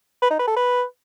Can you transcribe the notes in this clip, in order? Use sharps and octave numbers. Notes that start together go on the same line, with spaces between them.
B4
D#4
B4
A4
B4